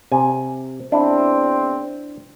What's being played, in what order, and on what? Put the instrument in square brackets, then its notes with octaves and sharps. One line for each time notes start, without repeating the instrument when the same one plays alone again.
[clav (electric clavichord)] C3 G#5
[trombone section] E2 C4 [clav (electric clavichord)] D4 E4